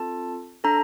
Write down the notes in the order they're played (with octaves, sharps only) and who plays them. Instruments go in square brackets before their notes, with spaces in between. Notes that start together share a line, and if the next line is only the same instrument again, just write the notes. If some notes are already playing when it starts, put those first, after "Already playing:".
Already playing: [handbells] C4 F4 A4 A5
D4 A4 A#5